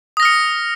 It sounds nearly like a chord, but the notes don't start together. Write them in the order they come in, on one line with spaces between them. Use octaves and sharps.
D#6 A#6 F6 C#7